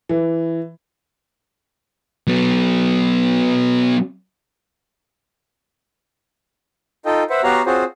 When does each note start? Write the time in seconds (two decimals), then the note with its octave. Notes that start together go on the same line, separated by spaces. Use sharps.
0.09 E3
2.27 F#3 B3
7.06 D#4 F4 A4 D#5 G5
7.30 B4 C5 E5 F#5
7.43 B3 F#4 G4 C#5 F5 A#5
7.66 C4 F4 F#4 G#4 C5 C#5